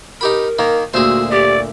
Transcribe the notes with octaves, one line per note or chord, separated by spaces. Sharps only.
D#4 G4 A#4 B5
D#3 A#3
D2 A#2 F#4 G#4 C5 E6
G4 D5